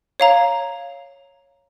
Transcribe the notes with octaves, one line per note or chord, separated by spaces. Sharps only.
C#5 F5 A#5